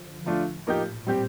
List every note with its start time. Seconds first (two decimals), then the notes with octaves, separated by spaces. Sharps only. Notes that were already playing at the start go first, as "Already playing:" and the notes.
Already playing: D3 F3
0.26 A2 F3 A3 D4 F4
0.67 A#2 F3 A#3 D#4 G4
1.07 G3 C4 G4